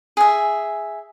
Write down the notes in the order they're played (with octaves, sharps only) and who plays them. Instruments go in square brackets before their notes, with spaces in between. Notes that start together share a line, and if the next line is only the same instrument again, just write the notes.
[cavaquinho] G#4 E5